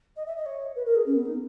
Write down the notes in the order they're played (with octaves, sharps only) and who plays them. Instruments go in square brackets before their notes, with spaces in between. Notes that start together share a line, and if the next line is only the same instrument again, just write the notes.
[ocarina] D#5
E5
D#5
C#5
B4
A#4
G#4
C#4
B3
D#4